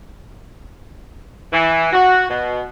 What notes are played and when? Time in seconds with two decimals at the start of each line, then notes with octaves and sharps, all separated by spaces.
1.52 E3
1.92 F#4
2.29 B2